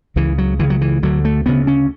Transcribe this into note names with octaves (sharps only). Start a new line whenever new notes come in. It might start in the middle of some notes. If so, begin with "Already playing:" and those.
C#2 C#3 E3
F#3
C#2 C#3 E3
F#3
E3
D2 D3 F#3
A3
D2 C#3 B3
C#4